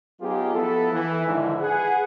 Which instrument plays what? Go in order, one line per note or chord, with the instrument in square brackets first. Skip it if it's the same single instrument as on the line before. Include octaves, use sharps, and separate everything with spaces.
[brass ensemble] F#3 B3 D#4 F4 G4 G#4
F3 B3 E4 A4
E3
G#2 D3 D#3 F3 E4
G#4 B4 F#5